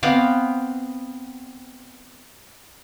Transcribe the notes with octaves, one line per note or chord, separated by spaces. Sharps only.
B3 C4 F5 D6